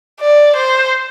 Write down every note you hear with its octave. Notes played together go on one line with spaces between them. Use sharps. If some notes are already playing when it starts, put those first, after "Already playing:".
D5
C5